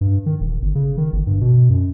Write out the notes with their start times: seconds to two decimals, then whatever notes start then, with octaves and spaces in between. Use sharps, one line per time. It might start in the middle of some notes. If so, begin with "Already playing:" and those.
0.01 G2
0.26 D#3
0.40 D#1
0.62 G1
0.75 C#3
0.98 D#3
1.13 G1
1.27 G2
1.41 B2
1.70 F#2